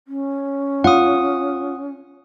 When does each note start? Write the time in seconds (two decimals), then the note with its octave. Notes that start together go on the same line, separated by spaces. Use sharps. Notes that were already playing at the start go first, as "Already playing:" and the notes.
0.08 C#4
0.84 F4 F#5 D#6